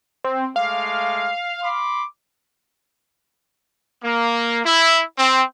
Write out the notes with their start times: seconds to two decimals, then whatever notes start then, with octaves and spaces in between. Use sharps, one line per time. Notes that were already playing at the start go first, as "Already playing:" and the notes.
0.24 C4
0.56 G#3 A3 F5 D6
1.62 B5 C6 D6
4.04 A#3
4.66 E4
5.18 C4